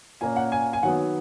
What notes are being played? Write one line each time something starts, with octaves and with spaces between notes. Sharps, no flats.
A#2 A#3 C#4 G#5
F#5
G#5
G#5
D#3 F#3 B3 F#5